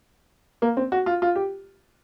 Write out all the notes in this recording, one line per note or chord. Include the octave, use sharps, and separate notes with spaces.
A#3
C4
F#4
F4
F4
G4